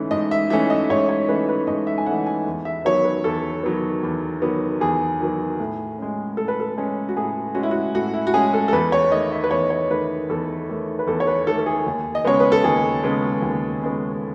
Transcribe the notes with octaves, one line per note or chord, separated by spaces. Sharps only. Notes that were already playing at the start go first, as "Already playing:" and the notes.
Already playing: G#2 E3 A3 C#4
G#2 D#5
E5
E3 A3 C#4 E5
D#5
G#2 C#5
C#5
E3 A3 C#4 B4
B4
G#2 D#5
E5
G#5
E3 A3 C#4 F#5
G#5
E2
E5
D#3 F#3 B3 C#5
B4
E2 A4
D#3 F#3 B3
E2
D#3 F#3 B3
E2 G#4
D#3 F#3 B3
A2
G#3 C#4
A2 A4
B4
A4
G#3 C#4
F#4
A2 G#4
G#3 C#4 F#4
E4
F#4
A2 F#4
E4
F#4
G#3 C#4 G#4
A4
A4
E2 B4
C#5
D#3 A3 D#5
E5
B4
E2 C#5
C#5
D#3 A3 B4
E2 A4
D#3 A3
B4
E2 A4
C#5
B4
D#3 A3 A4
A4
G#4
D#2
D#5
C#3 G#3 B3 C#5
B4
A4
D#2 G#4
C#3 G#3 B3
D#2
C#3 G#3 B3